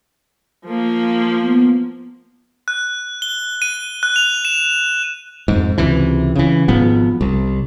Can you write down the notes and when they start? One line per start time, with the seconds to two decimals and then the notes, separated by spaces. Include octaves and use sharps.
0.65 F3 A#3
1.41 B3
2.68 F#6
3.22 G7
3.62 D#7
4.03 F#6
4.16 F7
4.45 E7
5.48 F2 G#2
5.78 C#2 C3 E3
6.35 C#3 E3
6.68 G#1 G#2 F3 B3
7.21 C2